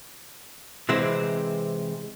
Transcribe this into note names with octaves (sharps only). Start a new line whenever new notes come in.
C3 E3 G#3 C4